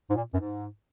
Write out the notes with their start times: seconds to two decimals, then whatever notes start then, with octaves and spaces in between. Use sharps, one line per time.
0.10 G#2
0.15 A#2
0.33 F#2
0.38 G#2